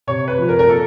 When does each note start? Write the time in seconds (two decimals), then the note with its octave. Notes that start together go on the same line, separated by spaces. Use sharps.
0.07 C3 C#5
0.28 B4
0.39 F3
0.49 A#4
0.59 A#4
0.69 A#3 A4